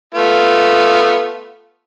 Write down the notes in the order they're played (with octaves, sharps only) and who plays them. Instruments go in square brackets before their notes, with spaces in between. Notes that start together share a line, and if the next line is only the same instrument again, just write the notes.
[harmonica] A3 B3 F4